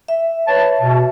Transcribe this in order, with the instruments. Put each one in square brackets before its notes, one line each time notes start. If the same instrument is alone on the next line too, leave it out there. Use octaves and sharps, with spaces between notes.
[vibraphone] E5
[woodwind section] B4 C#5 A5
B2